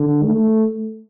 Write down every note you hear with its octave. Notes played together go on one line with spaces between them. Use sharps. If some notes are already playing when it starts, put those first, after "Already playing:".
Already playing: D3
A3